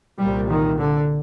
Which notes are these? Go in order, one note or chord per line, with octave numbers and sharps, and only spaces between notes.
C2 A#2 G3
D#3
D3